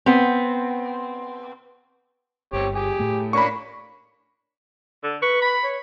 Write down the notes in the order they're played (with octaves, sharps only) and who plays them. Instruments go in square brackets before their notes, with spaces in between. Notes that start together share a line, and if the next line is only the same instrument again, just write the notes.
[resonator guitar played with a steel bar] B3 C4
[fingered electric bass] G1 [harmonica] C4 G4 C#5
[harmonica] G4 G#4
[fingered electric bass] A2 A3
[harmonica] A#3 C#4 D4 [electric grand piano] B5 C#6
[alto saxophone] D3
[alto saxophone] B4 [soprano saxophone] C#6
[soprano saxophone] B5
[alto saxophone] C#5